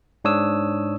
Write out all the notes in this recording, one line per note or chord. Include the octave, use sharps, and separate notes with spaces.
G#2 D4 C#5 D#6 E6